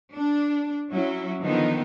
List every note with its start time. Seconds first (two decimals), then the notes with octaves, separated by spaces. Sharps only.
0.14 D4
0.91 F#3 C#4 E4
1.42 D3 D#3 F3 B3 D#4